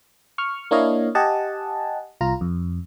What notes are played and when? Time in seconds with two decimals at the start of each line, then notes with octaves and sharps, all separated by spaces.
0.38 C#6 F6
0.71 A#3 D4 E4 C#5 D#5 F5
1.15 G4 D#5 F#5 G#5 A5
2.21 C2 F4 A#5
2.41 F2